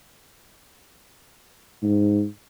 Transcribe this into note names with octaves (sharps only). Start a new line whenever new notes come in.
G#2